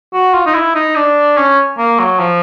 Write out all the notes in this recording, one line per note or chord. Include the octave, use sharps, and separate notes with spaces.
F#4
F4
D#4
E4
D#4
D4
C#4
A#3
F#3
F3